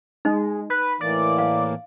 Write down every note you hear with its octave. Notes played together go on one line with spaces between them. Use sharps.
G#3 D#4
B4
A2 E3 A#3 D5
F5